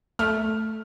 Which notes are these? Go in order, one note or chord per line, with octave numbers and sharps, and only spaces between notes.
A3 F6